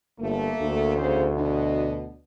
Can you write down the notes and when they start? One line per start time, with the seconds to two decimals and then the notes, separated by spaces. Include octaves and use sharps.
0.20 G1 A3 A#3
0.60 D2
0.96 E2 C#3 C5
1.35 B2 D4 D#5